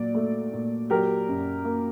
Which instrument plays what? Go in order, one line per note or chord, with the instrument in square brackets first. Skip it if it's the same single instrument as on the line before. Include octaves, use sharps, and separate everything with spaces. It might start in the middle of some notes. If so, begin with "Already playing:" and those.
Already playing: [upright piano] A#2 F#3 D5
A3
A#2
F#3 G4 A#4
F#2
A#3